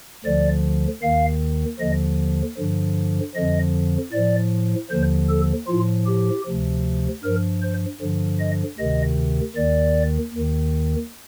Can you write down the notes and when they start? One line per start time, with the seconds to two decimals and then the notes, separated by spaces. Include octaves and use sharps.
0.25 D2 D3 F3 D5
1.02 D#2 D#3 F5
1.80 D#2 D3 F3 D#5
2.58 G2 D3 F3
3.35 F2 D3 F3 D#5
4.13 A2 F3 D5
4.91 D#2 D3 F3 C5
5.29 A4
5.68 A2 F3 F4
6.07 G4
6.46 D2 C3 F3
7.24 G2 F3 A#4
7.62 C5
8.01 G2 D3 F3
8.40 D#5
8.78 D2 C3 D#3 D#5
9.56 D#2 D#3 D5
10.34 D#2 D#3